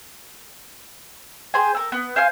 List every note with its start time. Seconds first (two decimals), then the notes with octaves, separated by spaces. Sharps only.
1.54 G#4 C5 G#5
1.75 A4 A#4
1.92 B3
2.16 C5 F5 G#5 F6